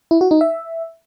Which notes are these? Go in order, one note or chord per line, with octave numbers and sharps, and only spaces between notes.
E4
F#4
D#4
E5